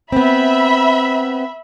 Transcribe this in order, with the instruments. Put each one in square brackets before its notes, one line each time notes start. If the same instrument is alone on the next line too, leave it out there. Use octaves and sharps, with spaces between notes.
[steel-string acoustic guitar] B3 C4 [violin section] E5 B5